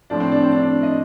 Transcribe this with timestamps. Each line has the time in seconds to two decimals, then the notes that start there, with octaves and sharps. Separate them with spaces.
0.10 A2 F3 C4 D4
0.20 C4
0.31 D4
0.42 C4
0.52 D4
0.62 D4
0.83 D#5